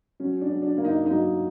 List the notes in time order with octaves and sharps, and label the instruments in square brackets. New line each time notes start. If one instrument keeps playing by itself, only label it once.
[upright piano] F#3 C#4
D4
F#3
D4
A#3
D#4
F#3 D#4